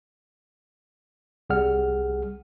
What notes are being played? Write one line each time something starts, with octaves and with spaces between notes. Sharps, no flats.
C2 G3 G#4 F#5 F6